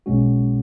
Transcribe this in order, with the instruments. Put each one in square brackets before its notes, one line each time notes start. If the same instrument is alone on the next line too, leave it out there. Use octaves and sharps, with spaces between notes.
[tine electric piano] B1 B2 G#3 C#4 F#4